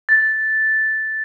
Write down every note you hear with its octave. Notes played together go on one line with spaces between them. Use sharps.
A6